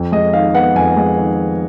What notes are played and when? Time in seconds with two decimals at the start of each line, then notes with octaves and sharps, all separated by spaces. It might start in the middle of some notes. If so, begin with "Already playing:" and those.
Already playing: F2
0.12 G#3 D#5
0.33 D#3 F5
0.54 B3 F#5
0.75 F2 G#5
0.97 G#3
1.17 D#3